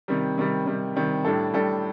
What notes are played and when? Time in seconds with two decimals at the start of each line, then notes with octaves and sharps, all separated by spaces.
0.08 C3 D#3 G3
0.38 C3 D#3 G3
0.66 C3 D#3 G3
0.96 C3 D#3 G3
1.25 A2 G3 D4 A4
1.53 A2 G3 D4 A4